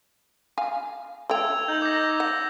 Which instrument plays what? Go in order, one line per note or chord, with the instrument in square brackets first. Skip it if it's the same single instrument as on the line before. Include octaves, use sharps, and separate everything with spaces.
[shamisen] F5 G#5
[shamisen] A3 G5 [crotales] E6 G#6 F7
[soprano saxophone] D#4 [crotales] G6 F#7
[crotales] D6 A#6
[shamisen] F#5